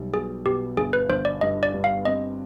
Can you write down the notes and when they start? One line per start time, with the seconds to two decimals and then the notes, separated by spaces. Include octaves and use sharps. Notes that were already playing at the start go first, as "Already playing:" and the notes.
Already playing: B1 G3
0.13 B2 G#4
0.45 B2 G4
0.77 G1 G#4
0.93 B4
1.09 G1 C5
1.25 D5
1.41 G2 D#5
1.63 D5
1.73 G2
1.84 F5
2.05 C4 D#5